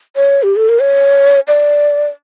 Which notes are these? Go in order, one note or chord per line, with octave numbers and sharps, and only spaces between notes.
C#5
G4
A4
A#4
C#5
D5